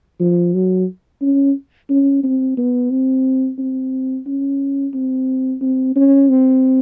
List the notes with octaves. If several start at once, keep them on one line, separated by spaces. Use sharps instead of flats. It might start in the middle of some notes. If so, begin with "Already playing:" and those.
F3
F#3
C#4
C#4
C4
B3
C4
C4
C#4
C4
C4
C#4
C4